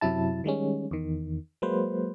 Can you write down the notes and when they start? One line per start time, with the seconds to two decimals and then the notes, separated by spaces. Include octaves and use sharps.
0.01 F#2 C3 F#3 E4 A5
0.44 D#3 G3 G#3 C#4
0.91 E2 D#3
1.62 F#3 G#3 A#3 B4 C5